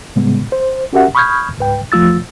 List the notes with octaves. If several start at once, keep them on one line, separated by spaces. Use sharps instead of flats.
A2 C#3 G3 G#3 B3
C5
C#4 F#4 G4 A#4 E5 F#5
B5 C#6 D#6 F6 G6 G#6
C#2 G#2 B4 G5
E2 F3 A3 F4 E6 A6